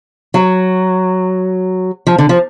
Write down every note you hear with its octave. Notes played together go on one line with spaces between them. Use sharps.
F#3
F3
D3
F3